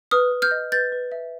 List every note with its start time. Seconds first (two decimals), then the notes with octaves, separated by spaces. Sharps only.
0.11 B4 D#6 F6
0.31 B4
0.42 F6 G6
0.51 D#5
0.72 B4 G6 A6
0.92 B4
1.12 E5